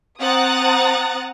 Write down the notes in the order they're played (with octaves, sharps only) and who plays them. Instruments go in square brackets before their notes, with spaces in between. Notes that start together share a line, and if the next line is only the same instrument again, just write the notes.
[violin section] C4 F#5 A#5 D#6 F#6 A6